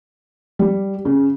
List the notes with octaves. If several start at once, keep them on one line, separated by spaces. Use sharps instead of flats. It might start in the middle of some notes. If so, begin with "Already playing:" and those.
G3
C#3